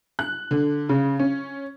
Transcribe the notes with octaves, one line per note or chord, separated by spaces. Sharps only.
F#6
D3
C#3
C#4